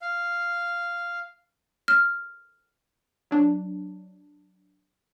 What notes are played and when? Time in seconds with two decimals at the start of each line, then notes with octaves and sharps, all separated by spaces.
0.01 F5
1.88 F6
3.31 F#3 D4